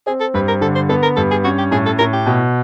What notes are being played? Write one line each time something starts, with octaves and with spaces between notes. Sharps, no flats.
C4 G#4
A4
G2 B4
A#4
D3 A4
C5
B3 A4
A#4
G2 A4
G#4
C#4 F#4
G4
A2 G#4
A4
A2 A#4
G4
B2